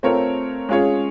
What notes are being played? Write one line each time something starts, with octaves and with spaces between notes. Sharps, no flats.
A3 C4 F4 A#4 C#5
G#3 C#4 F4 G#4 C#5